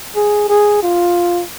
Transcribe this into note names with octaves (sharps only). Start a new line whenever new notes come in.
G#4
G#4
F4